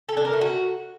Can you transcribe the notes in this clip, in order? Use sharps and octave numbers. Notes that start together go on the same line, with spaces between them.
A4
D4
A#4
A3
F#4